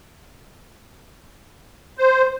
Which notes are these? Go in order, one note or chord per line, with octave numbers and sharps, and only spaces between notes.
C5